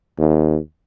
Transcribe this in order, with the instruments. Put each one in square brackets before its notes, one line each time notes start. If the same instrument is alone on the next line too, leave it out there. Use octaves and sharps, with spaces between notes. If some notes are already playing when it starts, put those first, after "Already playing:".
[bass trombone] D#2